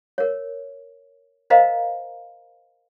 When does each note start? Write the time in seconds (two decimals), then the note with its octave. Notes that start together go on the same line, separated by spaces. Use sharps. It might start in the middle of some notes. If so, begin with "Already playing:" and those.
0.18 A#4 C#5
1.50 A#4 C5 D#5 F5 A#5